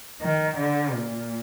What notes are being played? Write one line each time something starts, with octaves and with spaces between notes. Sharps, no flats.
D#3
D3
A#2